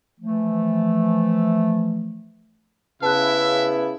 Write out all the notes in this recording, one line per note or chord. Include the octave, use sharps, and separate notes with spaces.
E3 F3 A3
C#3 B3 E4 E5 A5 F#6